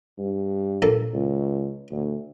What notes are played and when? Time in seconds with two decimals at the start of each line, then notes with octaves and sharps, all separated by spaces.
0.19 G2
0.82 A#1 A#3 A4
1.14 C#2
1.91 D2